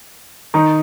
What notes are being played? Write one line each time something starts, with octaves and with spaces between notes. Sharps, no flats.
D#3 D#4